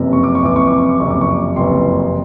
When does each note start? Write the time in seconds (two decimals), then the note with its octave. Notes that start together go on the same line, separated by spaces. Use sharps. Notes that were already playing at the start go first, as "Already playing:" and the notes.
Already playing: F#1 F2 C3 E3
0.13 C#6
0.23 D6
0.35 C#6
0.41 F#1 F2 C3 E3 D6
0.56 C#6
0.67 D6
0.78 C#6
0.89 D6
0.99 F#1 F2 C3 E3 C#6
1.10 D6
1.21 C#6
1.56 F#1 F2 C3 E3 C6